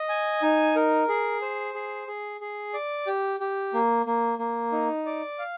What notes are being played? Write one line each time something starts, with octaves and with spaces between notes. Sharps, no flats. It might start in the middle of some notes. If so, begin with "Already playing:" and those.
Already playing: D#5
G#5
D#4
A#4
G#4
C5
G#4
G#4
G#4
D5
G4
G4
A#3
A#3
A#3
D#4
D5
F5